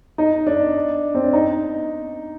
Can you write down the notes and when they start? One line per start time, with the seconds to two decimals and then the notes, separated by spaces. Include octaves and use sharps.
0.18 D#4
0.47 D4
1.15 C4
1.24 D4
1.33 D#4